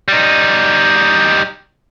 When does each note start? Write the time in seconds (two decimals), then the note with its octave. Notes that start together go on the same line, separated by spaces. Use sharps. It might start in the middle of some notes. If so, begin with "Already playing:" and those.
0.08 G3 D#4